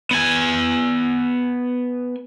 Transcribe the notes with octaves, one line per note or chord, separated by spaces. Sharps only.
B3 G#5